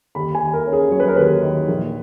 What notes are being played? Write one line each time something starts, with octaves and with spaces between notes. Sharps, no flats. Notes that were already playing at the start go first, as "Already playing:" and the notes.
D#2 B5
G#5
D#3
A#4
C#4
G#4
F#3 C#5
B4
A#4
D#2 B4
D#3
A#1